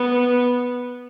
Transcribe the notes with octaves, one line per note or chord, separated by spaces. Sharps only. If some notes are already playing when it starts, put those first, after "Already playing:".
Already playing: B3